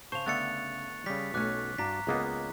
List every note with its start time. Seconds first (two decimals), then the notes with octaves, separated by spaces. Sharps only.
0.12 C#3 C5 A5 C#6 F7
0.26 D3 A3 B3 F#6 A6 C#7
1.06 C#3 G3 B6
1.34 B1 F#3 A3 C#4 D6 F#6
1.78 G2 D4 F#4 A#5 B6
2.07 C#2 A#3 B3 G#4 D#5